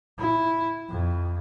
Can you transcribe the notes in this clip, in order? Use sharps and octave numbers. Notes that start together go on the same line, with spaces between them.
E4
F2